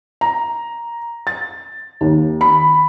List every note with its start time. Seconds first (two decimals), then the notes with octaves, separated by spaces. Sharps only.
0.21 A#5
1.27 A6
2.01 D#2
2.41 B5